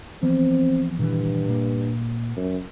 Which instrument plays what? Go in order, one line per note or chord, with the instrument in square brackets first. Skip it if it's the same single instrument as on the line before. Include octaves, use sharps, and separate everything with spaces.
[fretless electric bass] E3 F3 B3 [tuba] C4
[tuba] G2 [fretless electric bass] A#2 D#3 E3
[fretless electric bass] A#2 A#3
[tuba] F#2